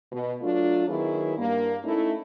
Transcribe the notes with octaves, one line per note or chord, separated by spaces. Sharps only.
B2
F#3 A3 D4 F4
D#3 F#3 B3 E4 G#4
G2 A#3
A3 C#4 D#4 E4